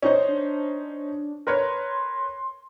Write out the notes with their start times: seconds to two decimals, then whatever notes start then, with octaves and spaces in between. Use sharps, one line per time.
0.02 C#4 D#4 C5 D5
0.28 D4
1.47 A#4 B4 C#5 C6